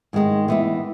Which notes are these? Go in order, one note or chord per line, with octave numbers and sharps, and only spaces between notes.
G#2 D#3 G#3 D#4
E3 B3 E4